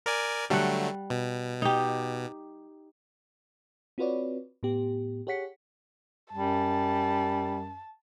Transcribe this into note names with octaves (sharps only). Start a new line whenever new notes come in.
A#4 D5 G#5
D3 F#3 G3 A3 F#5
B2
D#4 G4
C4 F4 F#4 B4 C#5 D5
A2 B3 G4
G4 G#4 C#5 F#5 B6 C#7
F#2 G3 A5